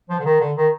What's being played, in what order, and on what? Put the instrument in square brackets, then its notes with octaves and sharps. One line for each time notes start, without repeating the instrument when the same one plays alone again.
[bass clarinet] F3
D3
D#3
D3
D#3